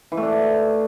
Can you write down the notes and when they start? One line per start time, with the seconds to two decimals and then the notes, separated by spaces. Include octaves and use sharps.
0.12 E3
0.17 A3
0.23 D4